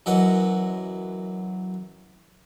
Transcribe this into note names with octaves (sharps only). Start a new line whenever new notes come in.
F#2 E3 D#5 F#5